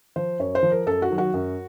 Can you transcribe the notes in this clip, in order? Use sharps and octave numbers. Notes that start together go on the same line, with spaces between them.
F3 C5
F#2 C#5
C5
F3
A#4
F#2 A4
F#4
D#3 F#3
F#4
F#2